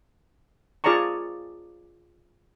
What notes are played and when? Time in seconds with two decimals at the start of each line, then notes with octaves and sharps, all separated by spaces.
0.84 F4 G#4 D5 A5 A#5 C#6